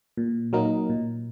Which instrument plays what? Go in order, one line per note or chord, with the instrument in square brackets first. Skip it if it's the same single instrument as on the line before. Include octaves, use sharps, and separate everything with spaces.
[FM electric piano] A#2
F#3 A#3 D#4 A#4
A#2